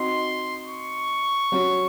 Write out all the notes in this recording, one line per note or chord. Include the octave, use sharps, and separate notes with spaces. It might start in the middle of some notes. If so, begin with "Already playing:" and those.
Already playing: C4 D#4 F#4 C6
C#6
F#3 C#4 F#4